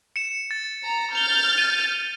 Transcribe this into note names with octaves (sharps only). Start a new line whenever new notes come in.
C#7 E7
A6
A#5
F6 G6 A6 F7 G7
D#7